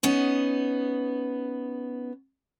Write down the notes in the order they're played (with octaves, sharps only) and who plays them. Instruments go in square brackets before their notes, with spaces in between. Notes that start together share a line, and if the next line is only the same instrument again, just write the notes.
[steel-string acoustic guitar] B3 C#4 D#4